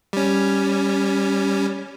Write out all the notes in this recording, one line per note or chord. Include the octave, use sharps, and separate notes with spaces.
G3 C#4